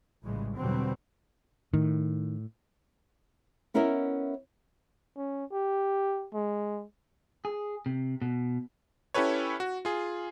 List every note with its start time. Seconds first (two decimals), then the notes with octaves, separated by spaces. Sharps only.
0.23 A#1 A2 C#3 E3 G3 G#3
0.56 E2 B2 D3 F#3 G3 C4
1.74 A2 D#3
3.74 B3 C#4 E4 A#4 D#5 E5
5.17 C#4
5.52 G4
6.34 G#3
7.45 G#4
7.86 C3
8.22 B2
9.14 C#4 E4 G4 A4 B4 C#5
9.60 F#4
9.85 F4 G#4